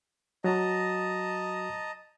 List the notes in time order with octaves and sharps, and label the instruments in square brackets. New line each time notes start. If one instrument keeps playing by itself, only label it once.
[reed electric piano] F#3 F#4 [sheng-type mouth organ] D#5 A5 A#5